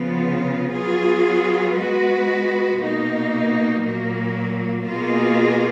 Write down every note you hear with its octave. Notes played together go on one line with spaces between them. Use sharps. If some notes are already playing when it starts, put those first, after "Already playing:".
Already playing: C#3 F3 B3 F4
F#3 B3 F4 G#4
G#3 B3 F#4 B4
B2 A#3 D#4
A#2 F#3 A#3
B2 A#3 F4 G#4